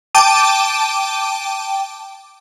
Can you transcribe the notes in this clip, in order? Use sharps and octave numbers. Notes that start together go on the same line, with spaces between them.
G5 A5 D6 D#7